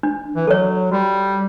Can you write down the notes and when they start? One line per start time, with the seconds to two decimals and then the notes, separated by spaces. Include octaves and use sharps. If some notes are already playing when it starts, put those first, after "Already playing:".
0.03 D4
0.36 E3
0.47 F#3 A4 C#5
0.92 G3 F#4